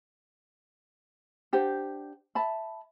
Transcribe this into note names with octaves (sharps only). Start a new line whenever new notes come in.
D4 G4 C5 F#5
E5 A5 B5